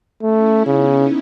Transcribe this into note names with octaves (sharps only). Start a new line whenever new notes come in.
A3 C#4 E4
C#3 B3 D#4